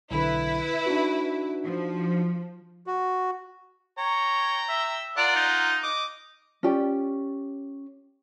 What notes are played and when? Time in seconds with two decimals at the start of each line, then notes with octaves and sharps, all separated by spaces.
0.11 B1 D3 E4 B4
0.86 D4 D#4 F#4
1.64 F3
2.87 F#4
3.98 C#5 G5 A#5
4.69 E5
5.17 F4 A#4 D5 F#5
5.36 D#4
5.83 D#5 D6
6.63 C#4 F4 G4 D5